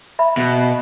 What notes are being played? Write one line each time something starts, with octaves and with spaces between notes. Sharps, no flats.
E5 B5
B2